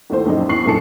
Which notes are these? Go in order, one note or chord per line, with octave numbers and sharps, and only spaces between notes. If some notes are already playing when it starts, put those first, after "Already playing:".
G#1 D#2 A3 E4 C5
A#1 F#2 D#4
E2 C#6 C7 F#7
F#2 A#2 D3 A4 A5 C#7